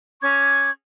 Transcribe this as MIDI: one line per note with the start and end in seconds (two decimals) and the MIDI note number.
0.21 0.70 61
0.21 0.70 85
0.21 0.70 86
0.21 0.70 92